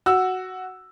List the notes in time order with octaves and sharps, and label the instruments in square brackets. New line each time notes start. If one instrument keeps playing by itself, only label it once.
[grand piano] F#4 E6